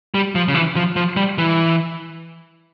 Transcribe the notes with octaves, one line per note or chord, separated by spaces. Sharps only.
G3
F3
C#3
E3
F3
F3
G3
E3